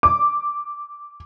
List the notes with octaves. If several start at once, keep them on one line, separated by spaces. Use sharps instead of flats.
D6